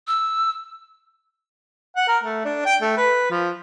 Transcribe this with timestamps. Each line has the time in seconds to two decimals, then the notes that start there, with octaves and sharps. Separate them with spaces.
0.08 E6
1.96 F#5
2.08 A#4
2.23 A3
2.45 D4
2.65 G5
2.81 A3
2.97 B4
3.30 F3